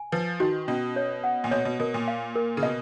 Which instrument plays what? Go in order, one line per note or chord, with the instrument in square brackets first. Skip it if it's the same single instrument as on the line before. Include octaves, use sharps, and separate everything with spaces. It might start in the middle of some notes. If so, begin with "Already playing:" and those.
Already playing: [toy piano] G#5
[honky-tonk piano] F3 [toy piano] B4
[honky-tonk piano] D#3 [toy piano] F#4
[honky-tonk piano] B2 [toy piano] C#4
[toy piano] C#5
F#5
[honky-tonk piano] A#2
[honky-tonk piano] B2 [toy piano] C#5
[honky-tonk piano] B2
[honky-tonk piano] B2 [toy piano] A#4
[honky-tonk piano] A#2
[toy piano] F5
A#4
[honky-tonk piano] C#3
[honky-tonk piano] B2 [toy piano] D#5